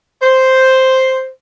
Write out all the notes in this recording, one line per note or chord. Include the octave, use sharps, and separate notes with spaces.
C5